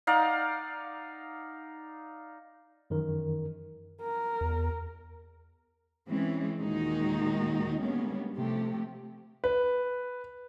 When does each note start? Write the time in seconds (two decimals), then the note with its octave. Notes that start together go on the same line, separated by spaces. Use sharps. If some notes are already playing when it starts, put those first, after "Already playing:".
0.07 D#4 D5 F5 F#5
2.90 F#2 D#3 E3 A#4
4.02 A#4
4.41 E2
6.08 E3 G#3 C4 C#4
6.59 D#2 A#2 D#3 G#3 D#4 F#4
7.80 D3 G3 G#3 A#3 B3 C#4
8.35 C3 F3 A3 G4
9.44 B4